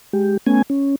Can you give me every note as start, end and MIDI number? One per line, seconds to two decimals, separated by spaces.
0.13 0.37 56
0.13 0.37 67
0.46 0.62 57
0.46 0.62 59
0.46 0.62 61
0.46 0.62 80
0.70 0.95 61